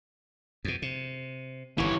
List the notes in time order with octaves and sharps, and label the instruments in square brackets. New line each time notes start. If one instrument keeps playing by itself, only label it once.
[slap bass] F2 B2
C3
[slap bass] G1 D#3 [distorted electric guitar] E3 C#5